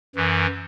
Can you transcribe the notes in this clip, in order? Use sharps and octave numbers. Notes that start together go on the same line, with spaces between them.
F#2 E3